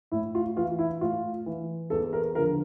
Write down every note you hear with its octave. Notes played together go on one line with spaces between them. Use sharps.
A2 E4
F4
E3 F4
E4
A2 F4
E3
E2 A4
A#4
D3 F3 A#4